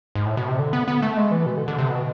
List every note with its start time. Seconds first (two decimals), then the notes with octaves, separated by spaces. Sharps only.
0.15 G#2
0.26 A2
0.37 B2
0.48 C3
0.59 D3
0.73 B3
0.88 B3
1.02 A3
1.17 G#3
1.32 E3
1.46 B2
1.57 D3
1.68 D3
1.78 C3
1.90 B2